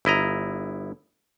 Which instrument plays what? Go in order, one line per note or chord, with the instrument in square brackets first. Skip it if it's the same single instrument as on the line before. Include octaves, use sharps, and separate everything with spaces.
[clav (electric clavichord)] G1 E4 D#5 A#5